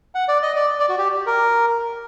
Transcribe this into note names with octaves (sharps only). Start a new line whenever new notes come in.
F#5
D5
D#5
D5
D5
F#4
G4
A#4